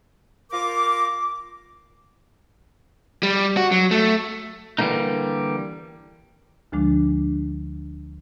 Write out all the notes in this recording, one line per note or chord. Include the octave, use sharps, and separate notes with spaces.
F4 A#4 F5 D6
G3
F#4
F#3
A3
D3 E3 G3 A3 A#3 D#4
D2 D3 F3 G#3 D4